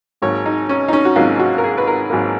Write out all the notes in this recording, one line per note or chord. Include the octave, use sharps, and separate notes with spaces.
G#1 G#2 F#3 A#3 C#5
D#4
C#4
D#4
C#4
F#4
G#1 G#2 F#3 A#3 F4
F#4
A#4
G#4
B4
A#4
G#1 G#2 F#3 A#3